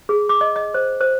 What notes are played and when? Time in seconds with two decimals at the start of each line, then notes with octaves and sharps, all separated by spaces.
0.09 G#4
0.29 D6
0.41 D#5
0.56 D#5
0.74 C5
1.01 C5